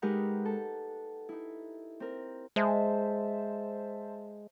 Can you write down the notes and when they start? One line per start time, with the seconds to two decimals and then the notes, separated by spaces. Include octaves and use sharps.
0.02 G#3 D#4 G4 A#4 B4 F#5
0.45 A4
1.29 D#4 E4
2.00 C4 A#4
2.56 G#3 C5 E5 A5